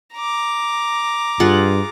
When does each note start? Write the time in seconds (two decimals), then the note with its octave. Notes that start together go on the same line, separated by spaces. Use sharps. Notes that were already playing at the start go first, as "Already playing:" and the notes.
0.15 A#5 D6
1.40 G2 F4 G#4 F#5